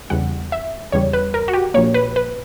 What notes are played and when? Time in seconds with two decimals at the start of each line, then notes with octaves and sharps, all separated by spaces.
0.10 E2 C#3 G3 F#5
0.52 E5
0.92 E2 C#3 G3 C#5
1.13 B4
1.34 A#4
1.48 F#4
1.53 G4
1.74 A#1 A#2 A#3 C#5
1.94 B4
2.16 B4